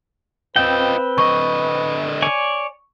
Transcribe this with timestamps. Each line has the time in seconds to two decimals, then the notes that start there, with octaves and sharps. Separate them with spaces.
0.56 C4 F4 B4 D#5 G5
1.18 D3 D#5 C#6
2.22 C#5 D5 G#5